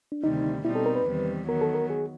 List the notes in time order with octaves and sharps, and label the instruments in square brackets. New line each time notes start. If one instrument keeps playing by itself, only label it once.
[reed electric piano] D4
[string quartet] D2 C3 D#3 G3 [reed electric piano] D#4
[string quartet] B2 G3 C4 D#4 [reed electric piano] E4
[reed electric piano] A4
A#4
B4
[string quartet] E2 C3 D#3 G3
[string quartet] D#3 F#3 B3 [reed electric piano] A#4
[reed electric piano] A4
A#4
G#4